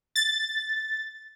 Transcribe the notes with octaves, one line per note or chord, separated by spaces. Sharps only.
A6